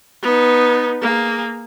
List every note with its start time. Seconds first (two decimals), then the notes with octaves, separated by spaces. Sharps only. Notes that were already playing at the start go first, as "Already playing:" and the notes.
0.22 B3 D#4
1.02 A#3 G#4